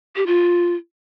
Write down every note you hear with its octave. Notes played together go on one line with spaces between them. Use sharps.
G4
F4